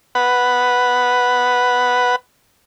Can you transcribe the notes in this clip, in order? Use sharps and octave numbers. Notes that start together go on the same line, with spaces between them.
B4 F#5